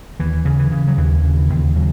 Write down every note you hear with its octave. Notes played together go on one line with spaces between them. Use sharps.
D#2 E3
C#3
E3
C#3
F#3
D#2 E3
C#3
E3
D#2
C#3 F#3